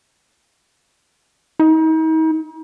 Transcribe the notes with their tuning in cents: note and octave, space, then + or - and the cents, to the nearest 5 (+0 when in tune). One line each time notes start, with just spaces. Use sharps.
D#4 +40